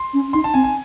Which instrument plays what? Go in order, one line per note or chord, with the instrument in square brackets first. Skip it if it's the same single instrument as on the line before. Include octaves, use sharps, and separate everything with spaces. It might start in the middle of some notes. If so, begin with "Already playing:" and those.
Already playing: [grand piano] C6
[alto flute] C#4
[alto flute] D#4 [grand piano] C6
[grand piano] A5
[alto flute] C4 [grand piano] G#5
[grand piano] G#5